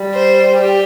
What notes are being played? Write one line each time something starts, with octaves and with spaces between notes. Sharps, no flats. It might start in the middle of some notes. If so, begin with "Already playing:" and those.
Already playing: G3
C5
G4